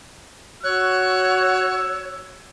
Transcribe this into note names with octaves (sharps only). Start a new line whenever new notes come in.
F#4 C#5 E6 F#6